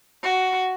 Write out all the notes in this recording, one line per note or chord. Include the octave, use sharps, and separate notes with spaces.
F#4